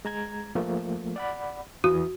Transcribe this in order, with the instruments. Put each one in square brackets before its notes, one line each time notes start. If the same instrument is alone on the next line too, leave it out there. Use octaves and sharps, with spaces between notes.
[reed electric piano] G#3 A#5 G#6
F3 A3 A#3
D5 F#5 B5
[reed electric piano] E2 E3 D#6 [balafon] F#4